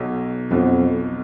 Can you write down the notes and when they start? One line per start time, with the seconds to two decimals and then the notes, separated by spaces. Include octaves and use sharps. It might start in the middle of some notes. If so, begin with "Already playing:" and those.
Already playing: B1 B2 F#3
0.50 B1 F2 B2 F#3